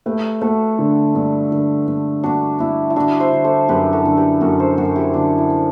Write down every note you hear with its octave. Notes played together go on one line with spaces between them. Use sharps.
A3 G4 B4
A3 F#4 A4
D3
G2
D3
G2
G2 D4 F#4
G2 E4
E4
D3 D4 F#4
C5 E5
D3
A4 C5
F#2 G4 B4
F#4 A4
D3
G4 B4
F#2 F#4 A4
A4 C5
F#2 F#4 A4
E4 G4
D3 D4 F#4
E4